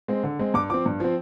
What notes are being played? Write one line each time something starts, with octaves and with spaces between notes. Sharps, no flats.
G#3 C4
D3
G#3 C4
G2 D6
F3 C4 D6
G2
F3 C4